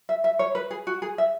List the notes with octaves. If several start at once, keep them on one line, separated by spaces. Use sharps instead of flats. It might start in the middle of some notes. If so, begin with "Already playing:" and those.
E5
E5
C#5
B4
G#4
F#4
G#4
E5